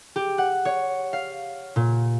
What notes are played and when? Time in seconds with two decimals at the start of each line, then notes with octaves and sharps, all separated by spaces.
0.16 G4
0.38 F#5
0.65 C#5
1.13 F5
1.76 A#2